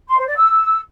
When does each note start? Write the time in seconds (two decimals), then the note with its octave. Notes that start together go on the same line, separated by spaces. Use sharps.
0.08 C6
0.17 C5
0.27 D5
0.36 E6